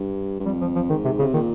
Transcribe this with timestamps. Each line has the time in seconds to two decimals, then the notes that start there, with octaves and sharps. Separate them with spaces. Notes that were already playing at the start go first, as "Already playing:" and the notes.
Already playing: G2
0.40 G2
0.46 F2 G3
0.61 F3
0.75 F3
0.90 G#2 D#3
1.05 C3
1.19 C#3
1.22 C3
1.33 A#2 D#3